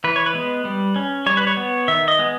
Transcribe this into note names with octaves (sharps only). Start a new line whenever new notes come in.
E3 B4
C#5
B4
G#3 B3
G3
C#4
G3 C#5
B4
C#5
B3
D#3 E5
D#5
G#3 B3